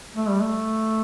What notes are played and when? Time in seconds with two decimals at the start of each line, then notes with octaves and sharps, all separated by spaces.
0.16 A3
0.29 G3
0.42 A3